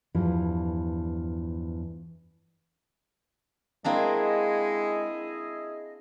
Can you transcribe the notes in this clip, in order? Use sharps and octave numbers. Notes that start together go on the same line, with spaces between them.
E2 G2 E3 F3
G#3 A#3 C4 D4 E4 G#4 D#5